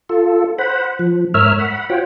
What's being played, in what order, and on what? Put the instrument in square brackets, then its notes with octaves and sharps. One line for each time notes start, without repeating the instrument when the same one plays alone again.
[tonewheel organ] F4 A4
C5 F#5 B5
F3
G#2 A#4 C#5 E5 E6 F6
F#5 B5
F4 F#4 C5 C#5 F#5 G5